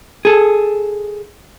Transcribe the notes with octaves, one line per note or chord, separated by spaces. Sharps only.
G#4 A4